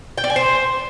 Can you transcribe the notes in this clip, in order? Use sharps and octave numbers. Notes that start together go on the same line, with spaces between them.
G5
D5
G#5
C5